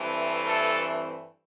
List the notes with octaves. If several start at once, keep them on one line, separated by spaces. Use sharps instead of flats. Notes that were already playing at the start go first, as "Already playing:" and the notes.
Already playing: G2 E3 A3 C4
A4